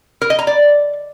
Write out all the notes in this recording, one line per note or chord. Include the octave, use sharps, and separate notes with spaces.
A#4
D#5
A#5
D5